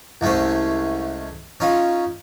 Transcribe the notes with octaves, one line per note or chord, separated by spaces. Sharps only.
C2 G#3 A3 C#4 C5
C#4 D#4 F4